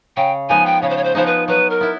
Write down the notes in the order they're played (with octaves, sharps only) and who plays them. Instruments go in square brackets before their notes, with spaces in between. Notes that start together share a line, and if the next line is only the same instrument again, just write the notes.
[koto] C#3 [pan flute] G5
[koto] F3 G#3 B3 D#4 [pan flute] G#5
[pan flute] G5
[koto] C#3 [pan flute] C#5
[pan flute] C5
C#5
C5
[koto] F3 G#3 B3 D#4 [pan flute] C5
[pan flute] B4
[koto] F#3 [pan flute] B4
[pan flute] A#4
[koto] B3 E4